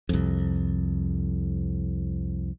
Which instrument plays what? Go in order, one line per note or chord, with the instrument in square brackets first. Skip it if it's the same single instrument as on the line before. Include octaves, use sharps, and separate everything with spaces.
[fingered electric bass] C2 F2